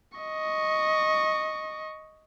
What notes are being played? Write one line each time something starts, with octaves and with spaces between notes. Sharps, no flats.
D#5 C#6